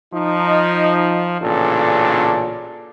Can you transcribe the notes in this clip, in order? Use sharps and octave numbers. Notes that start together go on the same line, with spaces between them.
F3 D#4
A1 A#2 C#3 D4 A4